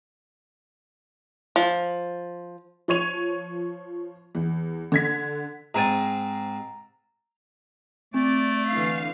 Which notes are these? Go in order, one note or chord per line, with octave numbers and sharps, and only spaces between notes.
F3
F3 C#5 C#6 G#6 D#7 F7
E2
D3 G#6 B6
G#2 C4 G#5 A#5 A6
A3 C4 D5
D3 E3 F5